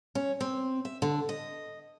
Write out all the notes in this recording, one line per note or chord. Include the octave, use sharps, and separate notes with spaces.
C#4
C4
E5
D3
D#5